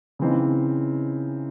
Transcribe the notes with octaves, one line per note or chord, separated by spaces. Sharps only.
C#3 E3 C4 D#4